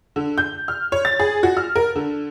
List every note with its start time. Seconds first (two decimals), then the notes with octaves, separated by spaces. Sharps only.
0.16 D3
0.38 G6
0.68 F6
0.92 C#5
1.05 A6
1.20 G#4
1.43 F#4
1.57 F6
1.76 A#4
1.96 D3